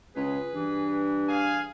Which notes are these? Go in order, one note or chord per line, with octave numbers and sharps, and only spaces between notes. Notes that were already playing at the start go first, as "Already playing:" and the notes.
C#2 G#4 B4
G2 E3
G#4 F5 G#5